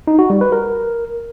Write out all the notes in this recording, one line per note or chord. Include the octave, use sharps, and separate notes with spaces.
D#4
F#4
G3
B4
A#4